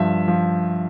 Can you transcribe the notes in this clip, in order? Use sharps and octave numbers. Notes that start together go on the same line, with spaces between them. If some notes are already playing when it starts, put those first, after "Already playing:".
Already playing: G2 F3 E5
F3